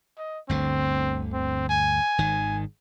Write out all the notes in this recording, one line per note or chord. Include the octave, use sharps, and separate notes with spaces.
D#5
G1 D2 D3 C4
C4
G#5
G#1 D#3